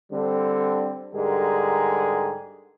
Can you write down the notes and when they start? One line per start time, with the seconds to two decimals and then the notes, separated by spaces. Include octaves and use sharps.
0.12 D3 G3 C4
1.14 G#2 D3 G3 G4 G#4 A#4